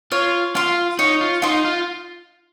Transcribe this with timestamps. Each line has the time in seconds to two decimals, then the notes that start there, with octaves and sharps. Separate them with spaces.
0.12 F4 C#5
0.55 F4 F5 C6
0.99 D#4 C#5
1.21 F4
1.42 D#4 F5 C6
1.65 F4